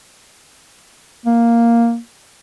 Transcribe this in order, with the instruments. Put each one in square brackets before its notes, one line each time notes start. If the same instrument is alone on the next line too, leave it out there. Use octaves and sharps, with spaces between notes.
[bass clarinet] A#3